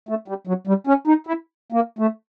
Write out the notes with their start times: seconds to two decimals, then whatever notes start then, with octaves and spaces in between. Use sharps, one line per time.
0.09 A3
0.28 G3
0.47 F#3
0.67 G3
0.87 C#4
1.07 D#4
1.27 E4
1.72 A#3
1.99 A3